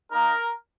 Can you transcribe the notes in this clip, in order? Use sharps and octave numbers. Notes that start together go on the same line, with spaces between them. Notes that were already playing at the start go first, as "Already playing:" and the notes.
A#3 D#4 A#4